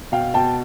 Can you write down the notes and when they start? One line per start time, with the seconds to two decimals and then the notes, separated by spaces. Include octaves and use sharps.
0.12 B2 F5 G5
0.34 B2 G5 A5